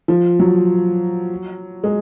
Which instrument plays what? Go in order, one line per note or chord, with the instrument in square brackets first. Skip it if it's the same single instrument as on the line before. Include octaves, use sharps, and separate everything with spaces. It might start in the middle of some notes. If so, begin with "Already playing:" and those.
[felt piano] F3
F#3
G#3